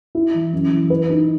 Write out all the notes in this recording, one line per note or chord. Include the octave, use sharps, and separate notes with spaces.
E4
E3
F#2
E3
B4
D#4